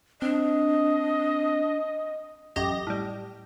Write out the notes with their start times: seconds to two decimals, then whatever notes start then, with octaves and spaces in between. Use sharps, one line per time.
0.22 C4 D4 D#5
2.56 A1 F#2 G4 D#5 A#6
2.87 A2 G3